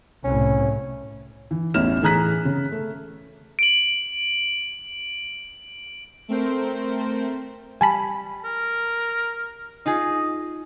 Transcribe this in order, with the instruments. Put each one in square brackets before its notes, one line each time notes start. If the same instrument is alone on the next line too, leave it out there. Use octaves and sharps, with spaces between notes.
[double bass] C2 A2 [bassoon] C#4
[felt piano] E3
A1 E2 C#4 E4 F6 E7
A2 E3 G#4 A#5 F#6 B6
C#3
A3
[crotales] D7 F#7
[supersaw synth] A3 C4 A#4 C5
[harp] G3 [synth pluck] G#5 A5 B5
[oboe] A#4
[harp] D#4 F4 G#4 [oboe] D#5